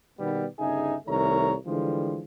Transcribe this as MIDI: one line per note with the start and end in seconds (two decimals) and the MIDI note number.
0.20 0.45 47
0.20 0.45 51
0.20 0.45 55
0.20 0.45 59
0.59 0.94 31
0.59 0.94 49
0.59 0.94 63
0.59 0.94 68
0.59 0.94 76
0.59 0.94 80
1.08 1.54 36
1.08 1.54 51
1.08 1.54 57
1.08 1.54 70
1.08 1.54 73
1.08 1.54 82
1.66 2.22 50
1.66 2.22 52
1.66 2.22 53
1.66 2.22 55
1.66 2.22 56